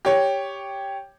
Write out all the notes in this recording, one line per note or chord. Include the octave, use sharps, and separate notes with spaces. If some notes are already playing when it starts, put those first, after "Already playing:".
G4 C#5